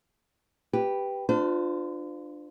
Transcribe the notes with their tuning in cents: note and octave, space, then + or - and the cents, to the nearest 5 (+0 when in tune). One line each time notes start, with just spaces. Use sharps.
G4 +0 B4 +0
D4 +20 F4 +5 C5 -40